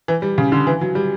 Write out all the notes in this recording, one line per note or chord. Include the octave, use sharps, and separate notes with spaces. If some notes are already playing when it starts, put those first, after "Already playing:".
E3
G3
C#3
D3
E3
F#3
G3